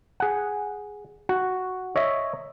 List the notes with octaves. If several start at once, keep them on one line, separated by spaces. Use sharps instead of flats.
G#4 F#5
F#4
C#5 D#5 E5